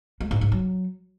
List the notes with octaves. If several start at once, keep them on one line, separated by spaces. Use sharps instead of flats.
G#3
G#2
G#2
F#3